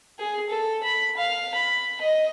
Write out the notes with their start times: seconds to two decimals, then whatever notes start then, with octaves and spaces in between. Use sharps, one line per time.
0.19 G#4
0.50 A4
0.83 B5
1.17 F5
1.55 B5
2.01 D#5